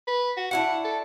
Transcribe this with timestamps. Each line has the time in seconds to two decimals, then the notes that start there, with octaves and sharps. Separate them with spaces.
0.07 B4
0.37 F#4
0.51 D4 E4 F#4 F#5
0.84 A4